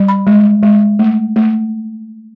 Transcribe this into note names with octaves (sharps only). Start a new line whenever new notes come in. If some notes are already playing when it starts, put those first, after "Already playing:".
Already playing: G3
B5
G#3
G#3
A3
A3